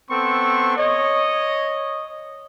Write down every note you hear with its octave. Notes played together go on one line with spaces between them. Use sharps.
B3 C4 A4 C6 C#6
C#5 D#5